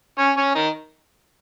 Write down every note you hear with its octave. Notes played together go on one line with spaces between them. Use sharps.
C#4 C#5
C#4 C#5
D#3 D#4